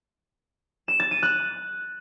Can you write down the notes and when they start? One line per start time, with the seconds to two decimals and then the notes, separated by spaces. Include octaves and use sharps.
0.88 E7
1.00 A6
1.11 D#7
1.23 F#6